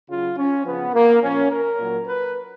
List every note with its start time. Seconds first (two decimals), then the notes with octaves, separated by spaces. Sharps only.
0.08 C#3 F#3 F4
0.36 C#4
0.64 C#3 F3 B3
0.93 A#3
1.21 A#2 F3 C#4
1.49 A#4
1.78 A#2 F#3
2.06 B4